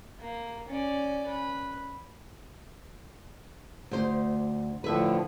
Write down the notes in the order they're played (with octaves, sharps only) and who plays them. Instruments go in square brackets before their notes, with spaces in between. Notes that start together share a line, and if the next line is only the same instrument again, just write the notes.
[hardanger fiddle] A#3
C#4 D5
B4
[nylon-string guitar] D2 C5
[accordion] A2 D3 F3 [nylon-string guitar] B4 E5